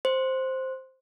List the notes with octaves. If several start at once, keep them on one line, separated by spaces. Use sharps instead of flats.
C5